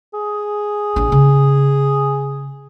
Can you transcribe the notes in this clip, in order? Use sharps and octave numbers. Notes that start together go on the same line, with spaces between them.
G#4
A1 D4
C#3